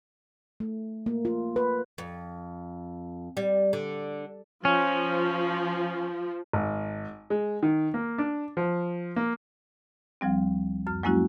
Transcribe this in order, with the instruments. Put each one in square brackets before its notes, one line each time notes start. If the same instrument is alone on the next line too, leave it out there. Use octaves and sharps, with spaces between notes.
[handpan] A3
A#3
F4
B4
[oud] F2
G3
D3
[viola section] F3 [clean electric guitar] C#4
[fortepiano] G#1
G#3
D#3
A#3
D4
F3
A#3
[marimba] D2 F3 G3 C4
F#2 F6
F#3 G#3 A#3 C#4 E4 F#4